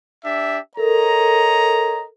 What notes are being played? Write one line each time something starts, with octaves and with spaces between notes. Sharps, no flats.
D4 G4 E5
A4 A#4 C#5 D#5 A#5